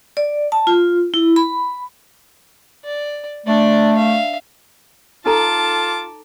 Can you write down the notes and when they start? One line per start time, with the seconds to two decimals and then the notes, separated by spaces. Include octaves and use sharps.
0.17 D5
0.52 A5
0.67 F4
1.14 E4
1.36 B5
2.84 D5
3.47 A3 D4 D5
3.95 E5 F5
5.26 D#4 F4 A4 A5 A#5 D6